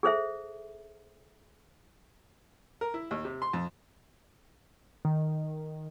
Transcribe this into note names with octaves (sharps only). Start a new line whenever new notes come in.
G#4 A4 C5 E5
A#4
E4
D#2
C3
C6
F2
D#3